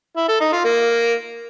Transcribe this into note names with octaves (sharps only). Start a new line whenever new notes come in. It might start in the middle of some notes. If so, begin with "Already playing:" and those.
E4
A4
D#4
F4
A#3